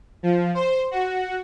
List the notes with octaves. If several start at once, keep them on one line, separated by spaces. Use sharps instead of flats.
F3
C5
F#4